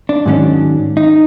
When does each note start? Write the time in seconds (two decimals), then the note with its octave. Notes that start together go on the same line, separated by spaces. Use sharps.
0.09 D4
0.26 G#2 D#3 F#3 A3 C#4
0.97 D#4